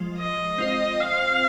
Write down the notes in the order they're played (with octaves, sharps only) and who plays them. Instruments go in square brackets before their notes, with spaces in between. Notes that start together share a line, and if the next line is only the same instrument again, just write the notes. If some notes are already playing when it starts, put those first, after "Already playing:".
Already playing: [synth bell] F3 G#3 F4
[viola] D#5
[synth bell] C4 F4 C5
[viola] F5